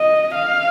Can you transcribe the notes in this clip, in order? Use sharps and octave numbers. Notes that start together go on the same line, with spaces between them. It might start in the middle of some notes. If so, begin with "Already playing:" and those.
Already playing: D#5
F5